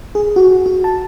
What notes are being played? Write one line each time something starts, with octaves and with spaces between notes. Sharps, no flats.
G#4
F#4
F#4
A5